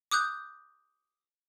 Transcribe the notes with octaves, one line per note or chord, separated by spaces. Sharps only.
D6 D#6 F#6 G6